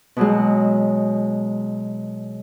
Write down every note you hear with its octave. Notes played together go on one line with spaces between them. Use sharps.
B2 F#3 G#3